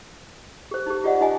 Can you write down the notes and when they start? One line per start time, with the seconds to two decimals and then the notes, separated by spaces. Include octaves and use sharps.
0.71 G4 C5
0.86 D#4 G4
1.04 F4 G4 D5 D#5 F#5
1.21 D#4 F4 D#5 G#5